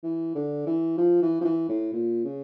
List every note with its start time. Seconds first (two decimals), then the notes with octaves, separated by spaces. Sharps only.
0.04 E3
0.35 D3
0.67 E3
0.98 F3
1.22 E3
1.41 F3
1.45 E3
1.69 A2
1.93 A#2
2.25 C#3